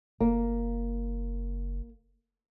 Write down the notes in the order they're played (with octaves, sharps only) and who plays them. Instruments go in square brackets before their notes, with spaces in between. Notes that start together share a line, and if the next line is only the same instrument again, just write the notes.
[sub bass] F#1 [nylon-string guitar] A#3